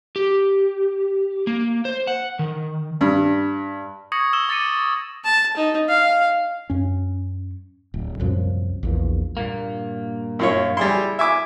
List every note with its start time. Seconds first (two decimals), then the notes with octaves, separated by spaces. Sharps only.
0.16 G4
1.47 A#3
1.85 C5
2.07 F#5
2.39 D#3
3.01 G2
4.12 C#6 D#6 G#6 A#6 C#7 F#7
4.33 E6 G#6 E7 G7
4.49 D6 A6 A#6 C#7 D#7
5.24 A5
5.57 D#4
5.89 F5
6.70 F#2 C#4
7.94 D1
8.20 C2 F#2 A#2 F3
8.83 A#1 E2 A#2
9.37 G2 A#2 A#3
10.39 F#2 F4 C#5
10.77 G3 E4 G#4 C6
11.19 E5 G#5 D6